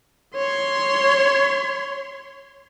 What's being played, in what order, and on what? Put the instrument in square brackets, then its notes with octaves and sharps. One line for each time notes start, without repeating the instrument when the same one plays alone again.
[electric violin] C#5 C6